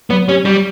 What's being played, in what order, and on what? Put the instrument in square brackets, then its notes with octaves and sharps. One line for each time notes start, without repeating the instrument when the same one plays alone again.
[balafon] F#3 [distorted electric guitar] B3
[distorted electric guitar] C#4 [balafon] G4
[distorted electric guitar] G3 [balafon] G4